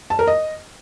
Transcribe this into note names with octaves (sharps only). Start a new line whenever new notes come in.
A5
A#4
D#5